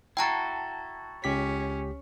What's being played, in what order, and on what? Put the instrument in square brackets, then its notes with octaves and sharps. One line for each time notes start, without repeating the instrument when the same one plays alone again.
[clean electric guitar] E4 F#4 A4 [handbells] G5 A5 A#5
[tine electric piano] C#2 G4 B6 [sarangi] C#4